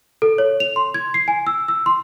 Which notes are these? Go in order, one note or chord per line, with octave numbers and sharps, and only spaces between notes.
A4
C#5
F7
C6
G#6
C7
G#5
E6
E6
C6